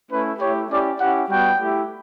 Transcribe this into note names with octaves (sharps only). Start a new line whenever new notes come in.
A3 C#4 E4 B4
A3 E4 G4 C#5
C#4 E4 G4 D5
C#4 E4 G4 F#5
G3 B3 F#4 G5
A3 E4 G4